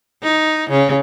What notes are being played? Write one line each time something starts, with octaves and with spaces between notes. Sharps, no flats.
D#4
C#3